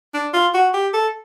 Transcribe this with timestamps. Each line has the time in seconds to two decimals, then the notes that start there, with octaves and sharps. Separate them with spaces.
0.14 D4
0.33 F4
0.54 F#4
0.74 G4
0.94 A4